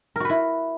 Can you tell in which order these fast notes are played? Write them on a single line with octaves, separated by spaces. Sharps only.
A#4 F#4 B4 E4